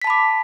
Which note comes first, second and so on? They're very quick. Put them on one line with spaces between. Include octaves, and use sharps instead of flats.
B6 A5 B5 D6